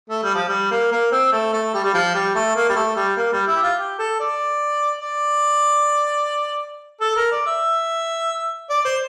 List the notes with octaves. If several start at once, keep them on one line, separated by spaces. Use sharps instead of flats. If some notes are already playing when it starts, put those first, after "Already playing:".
A3
G3
F3
G3
A#3
A#3
C4
A3
A3
G3
G3
F3
G3
A3
A#3
G3
A3
G3
A#3
G3
E4
G4
F4
G4
A4
D5
D5
A4
A#4
D5
E5
D5
C5